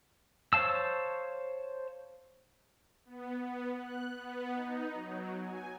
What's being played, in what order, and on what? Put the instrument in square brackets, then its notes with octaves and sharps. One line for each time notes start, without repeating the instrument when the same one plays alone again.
[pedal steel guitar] C5 C#5 F5 A5 E6
[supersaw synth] B3
B3
F#6
B3
D#4
F#3
G#5